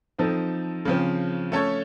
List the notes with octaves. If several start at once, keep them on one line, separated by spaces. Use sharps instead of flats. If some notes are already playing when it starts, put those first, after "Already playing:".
F3 C4 D#4 A4
C#3 F3 C4
A3 C#4 A4 C#5